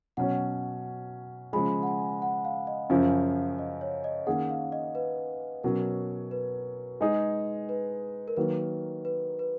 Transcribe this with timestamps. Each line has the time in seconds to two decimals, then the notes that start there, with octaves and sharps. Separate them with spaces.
0.17 B2 F#3 C#4 F#4 C#5 F#5
1.53 C#3 F3 G#3 B5
1.83 F#5
1.87 G#5
2.22 F#5
2.45 F5
2.67 D#5
2.90 F#2 C#3 F3 F5
3.59 D#5
3.81 C#5
4.04 D#5
4.27 D#3 A#3 C#4 G#4 F#5
4.50 F5
4.72 D#5
4.95 B4
5.64 B2 F#3 C#4 A#4
6.31 B4
7.01 G#3 D#4 G#4
7.69 B4
8.28 A#4
8.37 D#3 F#3 A#3 B4
9.05 B4
9.39 B4